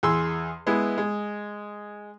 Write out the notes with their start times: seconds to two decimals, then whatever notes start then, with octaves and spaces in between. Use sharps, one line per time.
0.03 E2 G#4 C6 E6
0.67 G#3 B3 E4
0.98 G#3